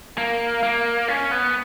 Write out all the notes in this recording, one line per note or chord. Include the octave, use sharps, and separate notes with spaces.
A#3
A#3
C#4
B3